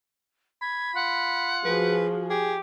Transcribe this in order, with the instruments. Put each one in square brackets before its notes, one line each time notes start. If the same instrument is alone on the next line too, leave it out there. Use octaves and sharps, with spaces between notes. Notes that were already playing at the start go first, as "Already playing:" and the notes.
[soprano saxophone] B5 [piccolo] G#6
[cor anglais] F4 [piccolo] F#5
[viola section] F3 F#4 G#4 [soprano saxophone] B4
[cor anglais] G4 [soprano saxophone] G#4